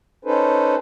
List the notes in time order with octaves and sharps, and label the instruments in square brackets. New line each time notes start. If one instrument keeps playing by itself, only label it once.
[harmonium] C#4 D#4 A4 B4 C5